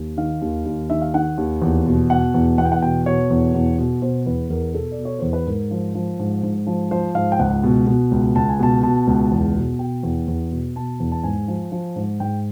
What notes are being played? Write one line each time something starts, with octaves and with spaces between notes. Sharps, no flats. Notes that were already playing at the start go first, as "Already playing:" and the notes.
Already playing: D#2
D#3 F5
D#2
D#2
D#3 E5
F5
D#3 F#5
D#2
E2
B2
B2 F#5
E2
E2 F#5
G5
F#5
B2 G5
B2 C#5
E2
E2
B2
B2 C5
E2 B4
E2 A#4
B2 A4
D5
B2
C#5
E2 C5
B4
G#2 A#4
F3
F3
G#2
G#2
F3
F3 C5
G#2 F5
G5
C#2 F#5
B2
B2
C#2
C#2 A5
G#5
B2 A5
B2 A5
C#2
E2
B2
B2 G5
E2
E2
B2
B2 A5
E2
A5
G#2 G#5
F3
F3
G#2
G#2 G5